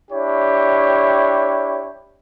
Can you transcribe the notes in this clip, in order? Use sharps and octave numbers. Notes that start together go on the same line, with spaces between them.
D4 E4 G4 C#5